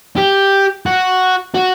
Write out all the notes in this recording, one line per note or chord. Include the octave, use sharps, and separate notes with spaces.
G4
F#4
F#4